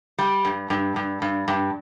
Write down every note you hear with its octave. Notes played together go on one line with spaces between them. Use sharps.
G3
G2
G2
G2
G2
G2